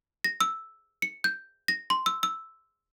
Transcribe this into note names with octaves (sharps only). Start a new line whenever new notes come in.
A#6
E6
C#7
G6
A#6
C6
E6
E6